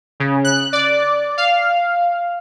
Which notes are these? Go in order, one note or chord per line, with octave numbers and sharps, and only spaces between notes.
C#3
F#6
D5
F5